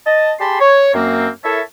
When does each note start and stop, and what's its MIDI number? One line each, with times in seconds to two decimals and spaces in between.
0.07 0.33 75
0.07 0.33 81
0.40 0.59 67
0.40 0.59 68
0.40 0.59 81
0.40 0.59 83
0.40 0.59 84
0.60 0.94 73
0.94 1.28 42
0.94 1.28 58
0.94 1.28 60
1.44 1.61 64
1.44 1.61 69
1.44 1.61 70
1.44 1.61 73
1.44 1.61 76
1.44 1.61 81